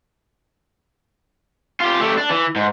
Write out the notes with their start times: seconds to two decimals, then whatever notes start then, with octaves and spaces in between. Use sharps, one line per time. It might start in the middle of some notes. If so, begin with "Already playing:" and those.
1.80 F4 G4
2.00 A3 G4
2.18 D4
2.30 E3
2.56 G#2